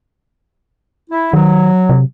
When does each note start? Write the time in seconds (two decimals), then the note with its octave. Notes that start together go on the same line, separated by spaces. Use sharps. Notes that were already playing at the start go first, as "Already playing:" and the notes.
1.10 E4
1.33 D#3 F#3
1.89 C3